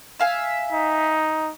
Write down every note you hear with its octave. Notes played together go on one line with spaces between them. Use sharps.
E5 F5 G#5
D#4